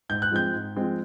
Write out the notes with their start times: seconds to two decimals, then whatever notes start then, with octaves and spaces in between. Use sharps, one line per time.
0.09 G#2 G6
0.22 F#6
0.31 F3 G#3 C4 G6
0.53 G#2
0.76 F3 G#3 C4